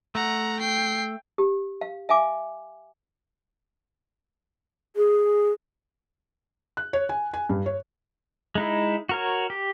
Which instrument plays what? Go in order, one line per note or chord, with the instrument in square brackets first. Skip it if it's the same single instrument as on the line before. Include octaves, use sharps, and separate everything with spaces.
[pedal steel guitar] A3 [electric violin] F#5 A#5
[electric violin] G5 C7
[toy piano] G4
F5
E5 F5 G#5 D6
[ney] G#4
[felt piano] F#6
C#5
G#5
G#5
G2
C#5
[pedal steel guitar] G#3 D#4 E4
F#4 A#4 C#5
G4